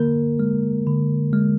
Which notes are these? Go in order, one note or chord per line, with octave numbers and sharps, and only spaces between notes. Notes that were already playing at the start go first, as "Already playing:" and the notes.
Already playing: D3 A#3 A#4
G#3
D3
G#3